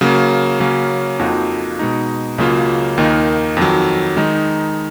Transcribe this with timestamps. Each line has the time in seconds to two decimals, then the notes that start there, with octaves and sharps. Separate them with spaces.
0.01 C#3 F#3 A#3
0.60 C#3 F#3 A#3 C#4
1.19 F2 F3 A#3 D#4 F#4
1.79 B2 G#3 D#4
2.38 C#2 C#3 F#3 A#3 F4
2.98 D#2 D#3 A#3 D#4
3.57 F2 D#3 F#3
4.17 D#3 G#3 D#4